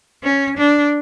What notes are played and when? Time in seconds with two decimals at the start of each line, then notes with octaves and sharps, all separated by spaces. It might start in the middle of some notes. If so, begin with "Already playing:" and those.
0.23 C#4
0.58 D4